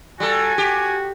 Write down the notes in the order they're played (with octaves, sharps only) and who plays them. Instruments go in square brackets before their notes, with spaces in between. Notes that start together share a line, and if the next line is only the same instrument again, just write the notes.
[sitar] G3 A4 [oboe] F#4 [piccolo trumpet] G#5
[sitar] G4